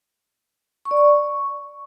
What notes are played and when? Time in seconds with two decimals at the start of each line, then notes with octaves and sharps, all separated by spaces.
0.85 C#6
0.91 D5
0.97 C#6